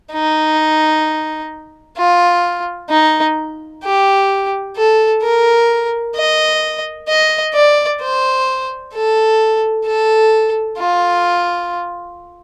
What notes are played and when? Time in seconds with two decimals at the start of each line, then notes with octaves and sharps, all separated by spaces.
0.12 D#4
1.97 F4
2.90 D#4
3.84 G4
4.77 A4
5.22 A#4
6.16 D#5
7.09 D#5
7.55 D5
8.01 C5
8.94 A4
9.86 A4
10.79 F4